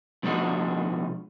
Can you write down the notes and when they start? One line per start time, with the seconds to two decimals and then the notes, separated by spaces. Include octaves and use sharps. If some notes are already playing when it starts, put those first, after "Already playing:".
0.23 B2 F3 G#3 D4 D#4 F#4